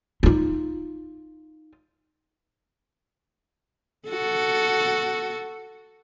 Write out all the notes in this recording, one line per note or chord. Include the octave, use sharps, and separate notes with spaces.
D#4 F4
F#4 A4